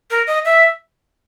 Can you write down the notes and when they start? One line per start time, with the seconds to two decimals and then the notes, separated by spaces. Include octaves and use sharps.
0.11 A#4
0.27 D#5
0.45 E5